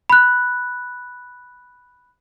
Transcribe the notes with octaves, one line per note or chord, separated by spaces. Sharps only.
B5 F#6